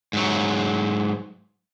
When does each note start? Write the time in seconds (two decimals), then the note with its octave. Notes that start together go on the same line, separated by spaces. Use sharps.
0.13 G#2 F#3